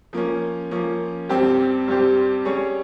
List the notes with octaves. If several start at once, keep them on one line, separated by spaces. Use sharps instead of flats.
F3 A#3 C#4
F3 A#3 C#4
G2 G3 C4 G4 C5
G2 G3 C4 G4 C5
G3 C#4 G#4 C#5